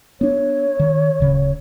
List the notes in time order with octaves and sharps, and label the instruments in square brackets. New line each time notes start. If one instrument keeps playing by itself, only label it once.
[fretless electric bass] B3 D4 [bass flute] C#5
[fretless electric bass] D#3
D1 C#3